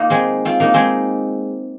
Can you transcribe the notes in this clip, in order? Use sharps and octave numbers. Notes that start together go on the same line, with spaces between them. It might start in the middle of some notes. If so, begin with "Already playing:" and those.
Already playing: A#3 D#4 F4
G#3 C4
C4 F4
A#3 D#4
G#3 C4